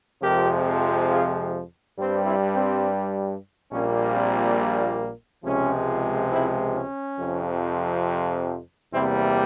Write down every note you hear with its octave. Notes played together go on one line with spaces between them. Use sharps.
F2 C3 F3 G#3 G4 A#4
F4 G#4
G2 G3 C4
C4 E4
C4
A#1 A#2 G3 A#3 C#4
C4
C#2 C3 F3 G#3 C#4
C4 E4
C#4
F2 C3 F3
E2 C3 G3 A#3 C4 E4